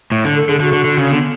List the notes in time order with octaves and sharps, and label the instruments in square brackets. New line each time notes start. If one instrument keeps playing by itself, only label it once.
[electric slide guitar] A2
D3
[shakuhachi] A4
[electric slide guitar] D3 [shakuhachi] G#4
[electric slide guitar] D3 [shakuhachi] F#4
[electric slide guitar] D3
D3
C#3
[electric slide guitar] D3 [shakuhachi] B3